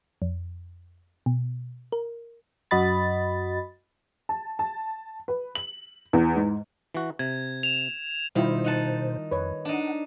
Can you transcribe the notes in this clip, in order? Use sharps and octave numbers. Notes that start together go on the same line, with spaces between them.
F2
B2
A#4
F#2 F#4 D#5 B5 A6
A5
A5
B4
F#7
E2
G#2
E3 F#4
C3 G#6
E7 F7
B2 D#3 G3 E4 F4 C5
D#4 F#5 A5
F2 B4 C#5
D4 D#4 F#5